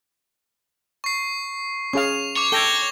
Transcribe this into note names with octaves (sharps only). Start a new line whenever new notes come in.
C#6 C7
C#4 G#4 F5 C#6 F7
C#5 C#6 D6
A4 G5 G#6 A#6 G7